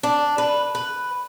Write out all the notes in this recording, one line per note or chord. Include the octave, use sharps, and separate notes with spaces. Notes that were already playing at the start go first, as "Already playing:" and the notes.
D4
B4
B4